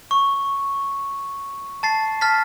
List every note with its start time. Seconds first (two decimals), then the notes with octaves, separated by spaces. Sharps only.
0.11 C#6
1.83 A5 A6 C7
2.21 A5 F6 A6 B6